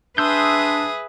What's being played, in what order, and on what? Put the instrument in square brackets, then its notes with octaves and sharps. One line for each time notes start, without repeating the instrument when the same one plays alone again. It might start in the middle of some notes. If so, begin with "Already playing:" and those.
[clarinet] D4 [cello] G#4 B4 [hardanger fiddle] E5 D#6 [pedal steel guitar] C6 E6 G6